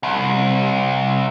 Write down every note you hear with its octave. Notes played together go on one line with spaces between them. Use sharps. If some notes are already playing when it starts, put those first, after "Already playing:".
C2